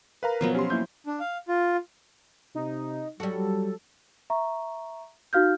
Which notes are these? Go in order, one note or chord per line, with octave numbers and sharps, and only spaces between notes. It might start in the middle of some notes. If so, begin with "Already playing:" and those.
A#4 B4 F5 A#5
B2 F3 F#3 B3
C#4 G4 C6
A#3 E4 G6
D4
F5
F4
C3 D#4
F#3 G3 F#4 A4
E5 A#5 C#6
D#4 F#4 F5 F6 G6